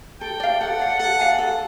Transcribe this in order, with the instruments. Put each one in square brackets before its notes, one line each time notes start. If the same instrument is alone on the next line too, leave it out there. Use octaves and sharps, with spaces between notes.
[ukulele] A4 [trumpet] G5
[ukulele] D5 F5
[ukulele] A4 [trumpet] F#5
[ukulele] D5 F5
[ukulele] A4 [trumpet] F#5
[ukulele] D5 F5 G#5
A4